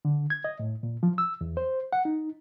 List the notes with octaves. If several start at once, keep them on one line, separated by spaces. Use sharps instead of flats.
D3
G#6
D#5
A2
A#2
F3
E6
E2
C5
F#5
D#4